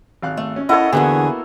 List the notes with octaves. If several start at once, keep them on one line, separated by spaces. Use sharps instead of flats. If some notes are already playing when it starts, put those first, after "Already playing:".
G#1 F5 F#6
A3
C#4
E4 A4 A#4 C#5 D#5 F#5
E2 G#2 D3 A#3 B3 F#4 G#4